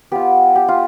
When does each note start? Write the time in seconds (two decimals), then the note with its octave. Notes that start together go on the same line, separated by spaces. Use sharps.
0.12 B3 F4 G4
0.56 G4
0.68 F4